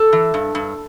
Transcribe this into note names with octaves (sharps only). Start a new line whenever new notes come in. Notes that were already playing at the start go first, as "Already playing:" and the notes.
Already playing: A4
E3
G2
G2